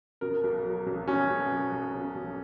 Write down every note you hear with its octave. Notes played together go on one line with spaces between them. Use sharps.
B2 A#4
B1
F#3
B1
B2 C#4
B1
F#3
B1
B2
B1